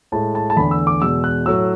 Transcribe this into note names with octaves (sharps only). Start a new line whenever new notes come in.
A2 G#3 A5
A5
A5
E2 D3 A3 B5
E6
D6
E2 B2 G#3 E6
F#6
A2 F#3 A3 E6